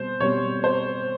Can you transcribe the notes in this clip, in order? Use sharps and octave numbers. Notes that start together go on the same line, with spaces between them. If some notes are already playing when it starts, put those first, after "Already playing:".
Already playing: B2 G3 C4 C5
B2 G3 C4 C#5
C5